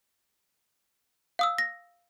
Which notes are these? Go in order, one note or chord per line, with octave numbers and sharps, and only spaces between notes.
F5 D#6 E6
A#6